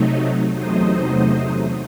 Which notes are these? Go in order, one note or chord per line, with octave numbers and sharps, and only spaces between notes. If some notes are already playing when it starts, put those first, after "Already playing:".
Already playing: C3 F#3 A3 D#4
E2 C3 F#3 A3 D#4 C5 D#5